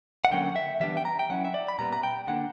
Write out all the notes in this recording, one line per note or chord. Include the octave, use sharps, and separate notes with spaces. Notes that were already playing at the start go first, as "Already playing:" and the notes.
F#5
D3 F#3 A#3 C#4 G5
E5
E3 G3 B3 D4 E5
G5
A#5
G5
F#3 C#4 E4 F#5
E5
D5
B5
A#2 G3 B3 A#5
A#5
G5
D3 A#3 D4 F#5